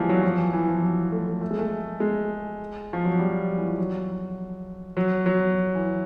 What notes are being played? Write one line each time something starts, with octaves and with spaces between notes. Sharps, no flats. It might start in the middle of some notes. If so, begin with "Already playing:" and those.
Already playing: E3 F3 G3 G#3 A#3
F#3
F3
E3
E3
F3
F#3
A3
A3
A3
G#3
A3
G#3
F3
F#3
G3
E3
F3
F#3
F#3
F#3
E3